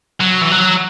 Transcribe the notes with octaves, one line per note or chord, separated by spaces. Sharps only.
F#3
E3
F#3